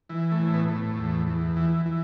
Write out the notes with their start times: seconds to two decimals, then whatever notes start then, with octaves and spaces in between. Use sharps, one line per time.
0.09 E3
0.32 A3
0.39 A2
0.54 B3
0.68 A2
0.97 E2
1.27 E2
1.56 E3
1.86 E3